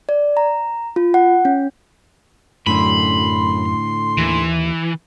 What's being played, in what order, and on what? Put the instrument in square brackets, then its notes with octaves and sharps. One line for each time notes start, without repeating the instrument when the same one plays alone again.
[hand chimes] D5
A#5
F4
F#5
C#4
[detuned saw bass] F#2 [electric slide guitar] A2 D3 [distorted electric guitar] B5 [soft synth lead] C6
[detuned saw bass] D#2 [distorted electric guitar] E3